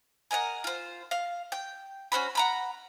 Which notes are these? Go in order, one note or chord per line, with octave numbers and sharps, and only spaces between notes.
G#4 A#4 D#5 F#5
F4 C5
F5
G5
C#4 F#4 C5 B5
F#5 A#5 B5